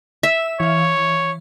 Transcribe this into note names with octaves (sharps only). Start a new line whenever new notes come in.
E5 E6
E3 C#5 F5